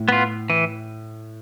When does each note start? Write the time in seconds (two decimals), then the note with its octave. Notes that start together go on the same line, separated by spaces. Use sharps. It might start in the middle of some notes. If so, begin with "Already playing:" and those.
Already playing: A2
0.09 B3 F4
0.50 E3